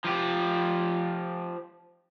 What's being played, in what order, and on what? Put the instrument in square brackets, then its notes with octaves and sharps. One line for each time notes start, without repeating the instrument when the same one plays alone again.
[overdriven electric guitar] F3 G4